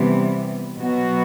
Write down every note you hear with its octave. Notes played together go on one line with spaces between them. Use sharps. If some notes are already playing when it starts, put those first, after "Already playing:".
Already playing: C3 E3 G3 B3
B2 F#3 B3 F#4